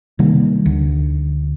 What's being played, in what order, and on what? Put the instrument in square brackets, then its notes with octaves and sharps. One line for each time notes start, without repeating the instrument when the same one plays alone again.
[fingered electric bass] C3 D#3 G3 A#3
D2